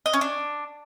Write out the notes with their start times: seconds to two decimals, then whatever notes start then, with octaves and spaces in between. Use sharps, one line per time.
0.06 D#5
0.13 C#4
0.21 D4